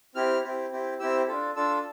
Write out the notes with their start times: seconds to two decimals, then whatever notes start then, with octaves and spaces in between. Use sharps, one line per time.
0.15 C4 E4 G4 F6
0.43 C4 E4 G4
0.71 C4 E4 G4
1.00 C4 E4 G4 E6
1.28 D4 F4 A4
1.56 D4 F4 A4 E6